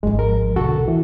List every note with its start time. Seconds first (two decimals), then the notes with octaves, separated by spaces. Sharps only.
0.03 G#1 F3 G#3
0.19 A#4
0.56 B2 D3 F#4 A4
0.74 A1 C3
0.88 E3